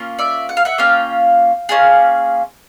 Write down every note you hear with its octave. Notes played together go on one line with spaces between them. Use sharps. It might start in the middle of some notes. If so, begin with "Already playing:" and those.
Already playing: A#3 C#4 F4
D5 E5
F#5
F5
E5 F#5
A#3 C#4 F4 F5 G5
A#3 C#4 F4 G#4